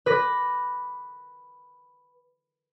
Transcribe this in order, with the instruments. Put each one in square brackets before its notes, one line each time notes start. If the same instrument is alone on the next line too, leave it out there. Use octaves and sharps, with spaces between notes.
[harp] B4 D6 A#6